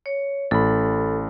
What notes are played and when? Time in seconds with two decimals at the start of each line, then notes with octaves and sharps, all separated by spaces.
0.06 C#5
0.51 A1 A4 B5